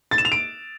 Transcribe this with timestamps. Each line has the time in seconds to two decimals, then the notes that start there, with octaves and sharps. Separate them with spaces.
0.11 A6
0.18 E7
0.25 F7
0.32 D7